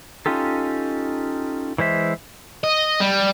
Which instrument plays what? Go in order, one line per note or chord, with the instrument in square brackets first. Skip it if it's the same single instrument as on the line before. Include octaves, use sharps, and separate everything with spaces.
[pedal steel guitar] C#4 D#4 F4 G4 A4
E3 G#3 C5 E5
[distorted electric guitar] D#5
G3